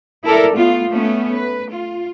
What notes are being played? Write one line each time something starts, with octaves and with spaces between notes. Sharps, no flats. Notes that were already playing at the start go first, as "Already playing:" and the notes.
E4 A4 A#4 D5
A3 B3 F4
A3 B3 C#4
B4
F4